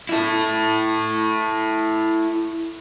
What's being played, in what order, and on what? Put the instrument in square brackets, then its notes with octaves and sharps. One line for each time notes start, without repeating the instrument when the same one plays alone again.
[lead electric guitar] E4 A4